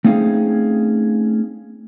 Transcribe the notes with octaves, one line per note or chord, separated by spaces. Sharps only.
A3 C4 C#4 D#4 G#4 F5